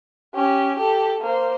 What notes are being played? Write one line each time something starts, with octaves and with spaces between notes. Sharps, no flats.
C#4 G4
G4 A4
A#3 C5